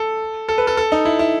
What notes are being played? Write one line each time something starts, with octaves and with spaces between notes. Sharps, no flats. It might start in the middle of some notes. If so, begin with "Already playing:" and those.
Already playing: A4
A4
B4
A4
A4
D#4
E4
E4